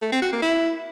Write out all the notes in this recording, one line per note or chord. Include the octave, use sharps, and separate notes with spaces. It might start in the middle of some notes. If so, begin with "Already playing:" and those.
A3
C4
F#4
A#3
E4